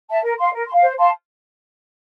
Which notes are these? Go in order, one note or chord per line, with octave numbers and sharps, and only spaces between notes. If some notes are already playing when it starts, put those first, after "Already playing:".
E5 A5
A#4
F5 C6
A#4
C6
F5
C5
F5 A5 C6